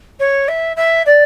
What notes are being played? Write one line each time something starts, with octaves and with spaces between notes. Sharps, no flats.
C#5
E5
E5
D5